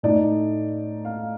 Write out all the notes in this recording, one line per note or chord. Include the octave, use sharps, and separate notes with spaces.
A2 A3 D#4 D5
F5